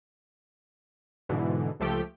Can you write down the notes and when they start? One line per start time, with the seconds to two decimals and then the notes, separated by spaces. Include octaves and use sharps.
1.29 G#2 B2 D3 E3
1.80 C#2 F3 A3 G4 G5